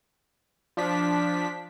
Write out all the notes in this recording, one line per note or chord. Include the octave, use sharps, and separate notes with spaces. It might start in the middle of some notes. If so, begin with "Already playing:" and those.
F3 D4 B6